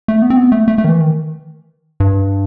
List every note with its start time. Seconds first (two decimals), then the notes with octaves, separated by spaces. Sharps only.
0.08 A3
0.22 B3
0.30 C4
0.37 B3
0.52 A3
0.68 A3
0.78 A3
0.84 D#3
0.89 E3
1.01 D#3
2.00 G2